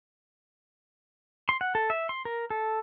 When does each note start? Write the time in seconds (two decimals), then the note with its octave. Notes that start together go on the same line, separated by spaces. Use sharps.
1.49 C6
1.61 F#5
1.75 A4
1.90 E5
2.09 C6
2.25 A#4
2.50 A4